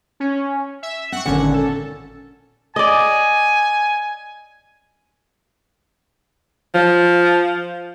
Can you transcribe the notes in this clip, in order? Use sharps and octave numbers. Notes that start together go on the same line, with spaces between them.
C#4
E5
C4 F#5 C#6
G#1 A#2 D3 C#4 F#5
A4
D5 D#5 G#5
F3